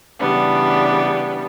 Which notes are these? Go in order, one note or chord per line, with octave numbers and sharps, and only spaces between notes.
C#3 E3 G3 B3 D4